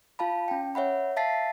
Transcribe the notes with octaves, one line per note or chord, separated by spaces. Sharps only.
F4 F5 A5 B5
C#4 G5
C#5 E5 F#5 B5
E5 F5 A5 A6 B6 C7